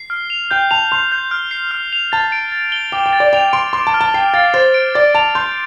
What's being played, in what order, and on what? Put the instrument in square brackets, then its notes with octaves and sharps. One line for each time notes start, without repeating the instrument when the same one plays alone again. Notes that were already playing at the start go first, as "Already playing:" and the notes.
Already playing: [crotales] C7
F6
F7
[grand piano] G5 [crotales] G6
[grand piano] A5 [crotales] F7
[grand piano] C6 [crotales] F7
[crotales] G6
F6
C7
F6
F7
[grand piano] A5 [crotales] A6
[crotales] D7
A6
G7
[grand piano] G5 [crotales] D6
[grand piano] G5
[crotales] A6
[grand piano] D5
[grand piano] G5 [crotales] F7
[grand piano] C6 [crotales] D7
[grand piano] C6 [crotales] D6
[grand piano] A5
[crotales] F6
[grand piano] A5
[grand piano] G5 [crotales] C7
[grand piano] F5 [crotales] A6
[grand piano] C5 [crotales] A6
[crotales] D7
[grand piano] D5 [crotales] A6
[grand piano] A5 [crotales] F7
[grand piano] C6 [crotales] G6